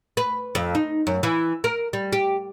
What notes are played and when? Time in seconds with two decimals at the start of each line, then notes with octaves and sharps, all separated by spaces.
0.17 B4
0.55 F2
0.75 D#4
1.07 F#2
1.23 E3
1.64 A#4
1.93 G3
2.13 G4